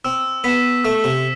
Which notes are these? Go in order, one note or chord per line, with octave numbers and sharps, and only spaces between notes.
C4 E6
B3 B6 E7
A3 E6
C3